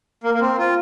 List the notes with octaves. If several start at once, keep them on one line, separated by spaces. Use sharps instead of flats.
A#3
A#3
C4
F4